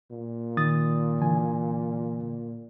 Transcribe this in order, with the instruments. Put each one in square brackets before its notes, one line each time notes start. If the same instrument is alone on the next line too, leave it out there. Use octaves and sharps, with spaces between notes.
[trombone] A#2
[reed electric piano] D#3 D#6 A6
D3 E3 G#5